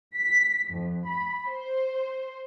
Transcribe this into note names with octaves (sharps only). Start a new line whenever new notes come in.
B6
F2
B5
C5